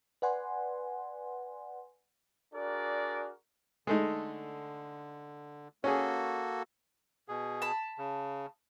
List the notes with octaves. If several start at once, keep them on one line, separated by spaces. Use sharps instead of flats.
B4 D5 F#5 G#5 C6
D4 F#4 G#4 A#4 D5
D3 G#3 A3 D#4
A#3 C#4 F#4 G#4 A4
B2 G#4
A5 B5
C#3